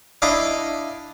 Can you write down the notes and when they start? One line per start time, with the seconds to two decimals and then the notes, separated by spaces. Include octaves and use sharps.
0.22 D4 E4 D#5 F5